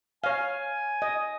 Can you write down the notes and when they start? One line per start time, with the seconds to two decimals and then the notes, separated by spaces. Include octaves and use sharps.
0.24 C#5 F5 G#5
1.02 D#5